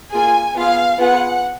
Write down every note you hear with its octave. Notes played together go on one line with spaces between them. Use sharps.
A#3 F4 G#4 G#5
B3 F4 G#4 F5
B3 F4 G#4 F#5